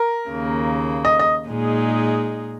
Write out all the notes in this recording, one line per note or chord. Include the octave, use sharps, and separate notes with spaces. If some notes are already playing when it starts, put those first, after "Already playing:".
Already playing: A#4
D#2 C#3 A#3
D#5
D#5
A#2 G#3 D#4 G#4